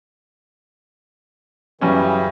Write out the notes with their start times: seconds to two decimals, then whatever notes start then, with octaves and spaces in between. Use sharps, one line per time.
1.81 F#2 C#3 E3 G3 C#4